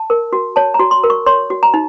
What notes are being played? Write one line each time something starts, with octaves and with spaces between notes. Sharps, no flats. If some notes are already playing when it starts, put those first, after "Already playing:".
Already playing: A5
A#4
F#4
C#5 A5
A#5
F#4
C6
A#4
C#6
C#5 C6
F#4
A#5
D#4